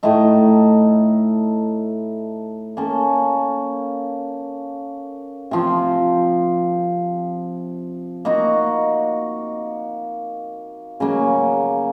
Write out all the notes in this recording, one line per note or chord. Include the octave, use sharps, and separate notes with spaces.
A2 A3 D#4
A#3 C#4 A4
C3 F3 C4
A#3 D#4 F#4
C#3 F#3 A#3